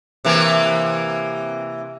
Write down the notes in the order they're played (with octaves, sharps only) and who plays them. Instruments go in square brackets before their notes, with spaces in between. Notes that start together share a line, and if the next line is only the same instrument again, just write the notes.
[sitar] C3 E3 A#3